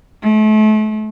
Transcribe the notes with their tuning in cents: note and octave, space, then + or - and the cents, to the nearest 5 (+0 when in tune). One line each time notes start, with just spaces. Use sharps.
A3 -35